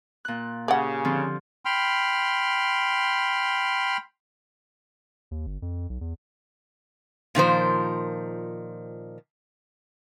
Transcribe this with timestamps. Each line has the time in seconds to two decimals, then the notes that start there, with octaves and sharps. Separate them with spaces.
0.25 A#2 F#6
0.68 C#3 G4 D5 F#5
1.05 D3 F3 C4
1.65 G5 B5 C6 F6
5.31 D#2
5.46 G1
5.62 F2
5.90 B1
6.01 E2
7.35 A#2 D#3 F3 C5